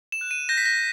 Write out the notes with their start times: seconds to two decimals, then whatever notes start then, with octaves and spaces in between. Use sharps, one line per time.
0.12 E7
0.21 F#6
0.31 D#7
0.49 G6 A#6
0.58 B6
0.66 A#6